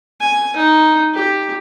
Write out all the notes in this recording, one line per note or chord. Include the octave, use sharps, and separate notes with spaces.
G#5
D#4
G4